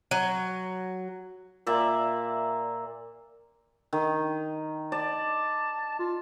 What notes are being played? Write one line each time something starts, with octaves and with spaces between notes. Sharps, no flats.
F#3
A#2 D5 E5
D#3
D5 A5
F4